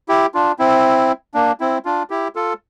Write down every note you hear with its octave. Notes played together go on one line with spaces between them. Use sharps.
E4 G4
D4 F4
C4 E4
A#3 D4
C4 E4
D4 F4
E4 G4
F4 A4